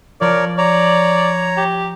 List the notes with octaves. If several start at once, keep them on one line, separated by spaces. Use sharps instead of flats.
F3 A#4 C#5 D5
C#5 D5 A#5
G4